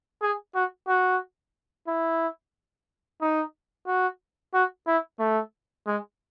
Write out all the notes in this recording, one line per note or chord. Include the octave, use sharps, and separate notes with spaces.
G#4
F#4
F#4
E4
D#4
F#4
F#4
E4
A3
G#3